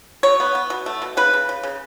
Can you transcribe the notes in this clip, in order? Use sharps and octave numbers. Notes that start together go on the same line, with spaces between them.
F#3 C#5
B3
B3
B2
A3
B2
C#3 B4
C#3
C#3
C#3